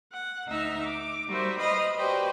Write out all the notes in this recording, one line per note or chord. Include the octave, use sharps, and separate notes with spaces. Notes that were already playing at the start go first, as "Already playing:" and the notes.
F#5
D2 D#4 E5 E6 F6
D6
G3 F#4 A#4 C5 E5
B4 C5 D#5 B5 D#6 F6
F#4 G4 B4 C5 D5 G5